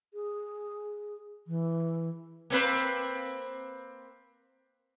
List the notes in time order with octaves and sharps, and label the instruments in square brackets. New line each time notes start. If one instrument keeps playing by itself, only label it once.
[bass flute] G#4
E3
[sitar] A#3 C4 B4